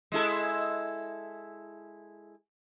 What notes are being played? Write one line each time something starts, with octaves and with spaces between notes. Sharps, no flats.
G#3 E4 A4